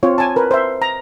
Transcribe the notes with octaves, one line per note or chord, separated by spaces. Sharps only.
C4 F4 C#5
G#5 A5
A#4 B4
C5 E5
A#5